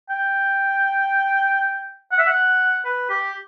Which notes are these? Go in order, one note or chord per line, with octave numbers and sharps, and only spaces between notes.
G5
F#5
E5
F#5
B4
G4